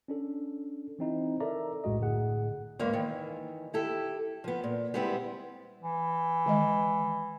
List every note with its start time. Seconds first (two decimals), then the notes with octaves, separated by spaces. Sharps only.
0.08 C#4 D4 A4
0.99 E3 C4 D#4 E4
1.41 A4 A#4 D5 E5 A#5
1.84 B1 F#2 A2 G#3 F#4 D#5
2.00 A2 D3 G#4 F#5
2.79 E2 G#2 A#3 F5
2.93 D#3 E3
3.74 E4 G4 A4
4.44 F3 B3
4.63 A#2
4.94 G3 G#3 B3 C4 E4
5.82 E3
6.46 D#3 G#3 D#5